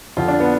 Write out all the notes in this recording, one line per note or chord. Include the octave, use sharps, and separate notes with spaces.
F2 D3 F3 F4
D4
B3